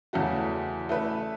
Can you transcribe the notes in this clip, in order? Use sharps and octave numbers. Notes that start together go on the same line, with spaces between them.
E2 C#3 A3 F#4
A3 E4 B4 E5